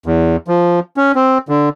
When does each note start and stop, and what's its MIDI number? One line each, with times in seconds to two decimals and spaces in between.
0.06 0.36 40
0.48 0.80 53
0.97 1.12 61
1.15 1.38 60
1.48 1.69 50